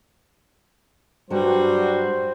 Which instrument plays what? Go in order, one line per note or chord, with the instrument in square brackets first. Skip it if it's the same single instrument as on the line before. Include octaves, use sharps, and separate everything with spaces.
[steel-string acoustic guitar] G2 F#3 [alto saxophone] G3 [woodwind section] F#4 [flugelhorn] C5